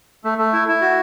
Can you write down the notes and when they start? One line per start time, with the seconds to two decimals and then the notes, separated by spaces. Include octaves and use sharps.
0.24 A3
0.38 A3
0.53 E4
0.68 E4
0.82 F#4